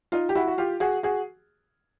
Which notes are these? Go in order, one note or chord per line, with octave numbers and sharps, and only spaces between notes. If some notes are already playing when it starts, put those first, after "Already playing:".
D#4 F4
G4
E4 F#4
F#4
F4 G4
F#4 G#4
F#4 G#4